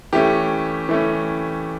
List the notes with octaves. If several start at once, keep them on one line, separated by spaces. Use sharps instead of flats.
E3 A3 C#4 G4
E3 A3 C#4